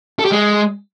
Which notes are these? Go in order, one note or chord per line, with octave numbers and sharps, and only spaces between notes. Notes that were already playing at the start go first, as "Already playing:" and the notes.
A4
G4
G#3